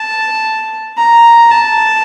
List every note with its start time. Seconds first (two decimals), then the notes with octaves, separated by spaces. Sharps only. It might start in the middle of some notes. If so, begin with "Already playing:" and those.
Already playing: A5
0.97 A#5
1.50 A5